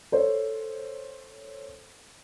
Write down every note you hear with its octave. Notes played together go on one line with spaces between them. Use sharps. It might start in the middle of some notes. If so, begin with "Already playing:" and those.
A4 C5 C#5